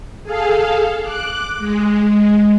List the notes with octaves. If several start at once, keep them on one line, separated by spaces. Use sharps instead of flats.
G#4 A4 F5
D6 F#6
G#3